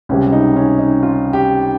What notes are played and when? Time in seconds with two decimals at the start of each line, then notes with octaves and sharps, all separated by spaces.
0.09 C#2 C3 G3 C#4
0.32 D#4
0.56 C#4
0.79 D#4
1.03 F4
1.33 G4